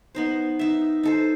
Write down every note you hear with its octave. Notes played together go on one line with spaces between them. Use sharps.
B3 D#4 C5
D#4 E5
D#4 A4 C5